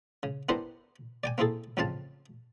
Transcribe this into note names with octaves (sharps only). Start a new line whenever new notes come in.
C#3
B3 D4 E4 G4 A#4 C5
D5 G5 G#5
A#3 C4 E4 G#4 A4
A1 F2 C#3 C4 F5 A5